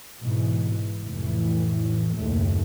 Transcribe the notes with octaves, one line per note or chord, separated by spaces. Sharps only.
G#2 B2 E3
F1 A2 E3
F#1 D#2 A2 A3